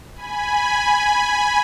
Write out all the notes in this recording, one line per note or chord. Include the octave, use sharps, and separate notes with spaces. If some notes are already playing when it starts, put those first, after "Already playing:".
G#5 B5